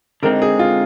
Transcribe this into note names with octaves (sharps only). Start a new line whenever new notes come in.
D3 G#3 C4 D#4 A#4
G#4
F4